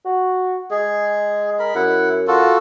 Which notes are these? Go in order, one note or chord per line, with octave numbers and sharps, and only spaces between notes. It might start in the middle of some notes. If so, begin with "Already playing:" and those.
F#4
G#3 G#4
A#4 B5
F#2 E4 F#5
F4 F#4 A4